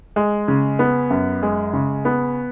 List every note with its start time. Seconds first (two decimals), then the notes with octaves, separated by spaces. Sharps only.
0.16 G#3
0.48 C#3
0.79 B3
1.10 F#2
1.43 G#3
1.73 C#3
2.05 B3